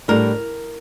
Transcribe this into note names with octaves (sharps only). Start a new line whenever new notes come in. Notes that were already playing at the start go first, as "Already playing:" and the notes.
A2 G3 D4 A#4